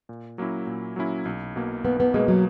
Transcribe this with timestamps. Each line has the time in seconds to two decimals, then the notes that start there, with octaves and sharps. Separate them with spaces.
0.09 A#2
0.38 F#3 A#3 C#4 E4
0.67 A#2
0.96 F#3 A#3 C#4 E4
1.25 B1
1.56 B2 A#3
1.84 B1 B3
2.00 B3
2.14 B2 G#3 A#3
2.28 F#3